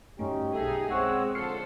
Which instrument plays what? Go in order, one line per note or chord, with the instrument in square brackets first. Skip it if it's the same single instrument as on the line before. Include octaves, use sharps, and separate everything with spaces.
[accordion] D2 C#4 D#4 [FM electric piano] G2 A3 [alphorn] G4
[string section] B1 D#4 G#4 [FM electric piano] A4 [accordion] E5
[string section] G#3 [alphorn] C4 [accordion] C#5 F#5 E6
[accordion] D3 [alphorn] F3 [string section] A4 C5 [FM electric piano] F6 C7 C#7